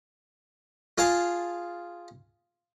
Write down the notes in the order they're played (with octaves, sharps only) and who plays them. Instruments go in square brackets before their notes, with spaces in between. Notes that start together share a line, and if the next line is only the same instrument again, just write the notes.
[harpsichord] F4 G#4 F5 A5